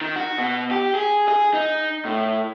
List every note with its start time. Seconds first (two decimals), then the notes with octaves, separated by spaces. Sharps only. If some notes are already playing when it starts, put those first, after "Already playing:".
0.01 D#3
0.16 F#4
0.38 B2
0.71 G4
0.95 G#4
1.28 G#4
1.54 D#4
2.05 A2